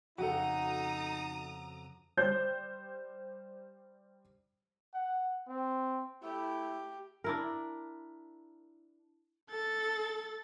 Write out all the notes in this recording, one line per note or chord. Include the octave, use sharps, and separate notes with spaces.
F2 C#3 D#4 F#4 A4 F#5 A#5 D#6
G3 C5 G6
F#5
C4
A3 E4 G4
D4 E4 A#4
A4 A6